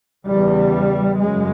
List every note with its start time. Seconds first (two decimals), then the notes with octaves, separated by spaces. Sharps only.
0.26 E2 C#3 G3
1.19 F#2 C#3 G#3